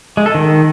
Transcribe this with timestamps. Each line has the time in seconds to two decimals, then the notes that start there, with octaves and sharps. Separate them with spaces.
0.17 G#3
0.26 A4
0.35 D#3